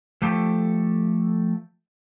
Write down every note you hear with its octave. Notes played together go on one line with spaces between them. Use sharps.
F3 A3 G4 A4